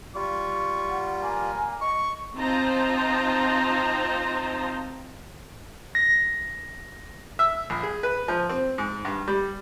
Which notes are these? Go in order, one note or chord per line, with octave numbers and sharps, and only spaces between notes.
G3 F4 C#6
F#5
A#3 G#5
D#5 C#6
C4 D#4 F4 C5 A5 A#5
A#6
E5
A#1
G#4
B4
F3
C4
G#2
G2
G3